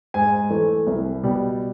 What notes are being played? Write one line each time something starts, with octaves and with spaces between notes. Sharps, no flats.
G#2 G#5
E3 A3
C2
B2 G3